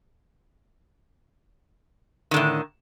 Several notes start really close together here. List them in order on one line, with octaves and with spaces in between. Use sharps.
D#3 D3 A2